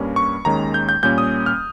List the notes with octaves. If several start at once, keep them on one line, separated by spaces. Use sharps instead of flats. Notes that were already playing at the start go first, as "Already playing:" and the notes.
Already playing: G2 G3 A#3 C#4
C#6
D#2 D#3 G#3 C#4 A#5
G6
G6
A#2 G3 A#3 C#4 G6
D#6
F6